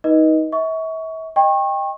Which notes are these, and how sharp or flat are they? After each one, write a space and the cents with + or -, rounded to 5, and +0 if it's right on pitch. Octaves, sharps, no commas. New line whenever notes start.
D#4 +20 B4 -35 D#5 +5
E5 -40 C#6 +20
D#5 +0 G5 +20 C#6 -30